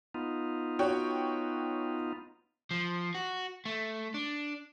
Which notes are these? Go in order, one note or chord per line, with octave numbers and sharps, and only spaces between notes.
B3 D#4 F4
F#4 C#5 G5
F3
F#4
A3
D4